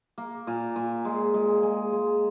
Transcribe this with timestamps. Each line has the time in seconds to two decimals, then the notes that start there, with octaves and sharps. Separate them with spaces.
0.18 A#3
0.47 A#2
0.76 A#2
1.05 G#3
1.34 G#3
1.63 G#3
1.92 G#3